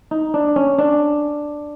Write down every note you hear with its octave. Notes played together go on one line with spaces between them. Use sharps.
D#4
D4
C#4
D4